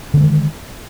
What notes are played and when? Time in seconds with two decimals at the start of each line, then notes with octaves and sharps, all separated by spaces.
0.14 D3
0.17 B3
0.20 G#3
0.23 D#3